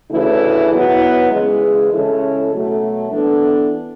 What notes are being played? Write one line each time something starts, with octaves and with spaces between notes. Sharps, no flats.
D2 C#3 E3 A3 E4
F#3 B3 E4
C#3 E3 G#3
C#3 G#3 C#4 E4 A4
B2 F#3 A3
E3 B3 D4 A4